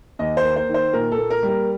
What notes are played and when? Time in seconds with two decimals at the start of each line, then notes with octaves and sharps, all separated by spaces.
0.19 D#2 D#5
0.37 C5
0.44 A#3
0.56 C5
0.69 D#3
0.74 C5
0.93 A#2 A#4
1.12 A4
1.18 A#3
1.30 A#4
1.43 G3
1.49 A#4